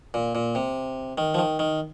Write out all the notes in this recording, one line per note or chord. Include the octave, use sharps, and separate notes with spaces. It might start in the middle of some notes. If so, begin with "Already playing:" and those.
A#2
A#2
C3
D#3
F3
D#3
D#3